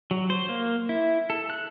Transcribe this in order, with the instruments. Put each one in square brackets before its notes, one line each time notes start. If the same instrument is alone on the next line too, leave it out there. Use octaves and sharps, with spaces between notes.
[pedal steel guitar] F#3
C5
A#3
E4
A4
F#6